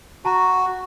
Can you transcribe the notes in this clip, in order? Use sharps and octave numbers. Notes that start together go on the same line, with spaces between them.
F#4 A5 A#5